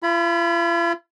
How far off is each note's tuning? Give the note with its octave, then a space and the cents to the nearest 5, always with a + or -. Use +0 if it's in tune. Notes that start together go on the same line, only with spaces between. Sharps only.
F4 -45 B5 +0